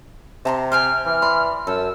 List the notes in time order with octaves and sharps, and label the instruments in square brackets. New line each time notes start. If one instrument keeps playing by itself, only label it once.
[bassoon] C3 [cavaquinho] A5 A#5 C6
[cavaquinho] C5 G5 G#5 [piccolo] F6
[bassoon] E3 [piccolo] F6
[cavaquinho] D5 B5 C6
[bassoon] F#2 [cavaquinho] A4 [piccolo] E6